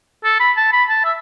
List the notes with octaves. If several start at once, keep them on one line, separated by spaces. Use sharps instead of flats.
A4
B5
A5
B5
A5
E5